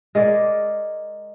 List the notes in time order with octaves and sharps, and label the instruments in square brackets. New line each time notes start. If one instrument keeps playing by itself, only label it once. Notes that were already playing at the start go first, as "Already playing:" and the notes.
[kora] G#3 A#4 D5